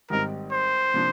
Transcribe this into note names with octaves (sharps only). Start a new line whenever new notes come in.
G#1 G#2 G3 C4 D#4 A#4
C5
C3 F3 A#3 D4